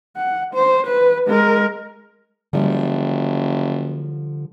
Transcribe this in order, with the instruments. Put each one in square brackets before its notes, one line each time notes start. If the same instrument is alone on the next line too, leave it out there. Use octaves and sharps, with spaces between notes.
[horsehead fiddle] F#5
C5
B4
G#3 A#4
[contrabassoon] F#1 [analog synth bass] D3 [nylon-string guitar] F3 G3